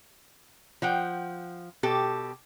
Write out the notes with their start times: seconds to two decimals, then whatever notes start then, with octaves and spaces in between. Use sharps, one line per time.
0.82 F3 F#5 G5
1.83 B2 G4 A4